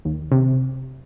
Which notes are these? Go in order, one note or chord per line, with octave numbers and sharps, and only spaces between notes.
D#2
C3